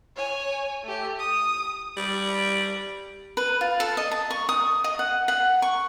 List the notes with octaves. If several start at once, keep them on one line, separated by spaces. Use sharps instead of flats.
C#5 G#5
A3 G4
D#6
G3
B4
F4
A4
D#5
A5
C#6
D#6
D#5
F#5
F#5
C#6